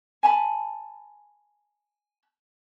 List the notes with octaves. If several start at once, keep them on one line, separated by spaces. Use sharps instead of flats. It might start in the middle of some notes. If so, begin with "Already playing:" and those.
G#5 A5 B5